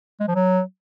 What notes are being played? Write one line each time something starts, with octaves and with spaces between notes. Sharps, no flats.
G#3
F3
F#3